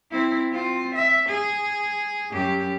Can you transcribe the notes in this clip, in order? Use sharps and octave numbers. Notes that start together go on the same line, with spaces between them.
C4 E4
C4 F4
E5
G#4
F#2 G4